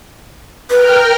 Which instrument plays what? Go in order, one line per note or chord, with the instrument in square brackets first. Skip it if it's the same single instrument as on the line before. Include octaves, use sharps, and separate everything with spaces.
[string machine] A#4 G5 F6 [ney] B4